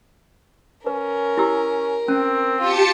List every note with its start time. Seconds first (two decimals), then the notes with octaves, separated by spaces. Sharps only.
0.87 C#4 A#4 B4
1.38 E4 G4 E6
2.08 C4 C#4
2.60 F4 G4 A5 C#7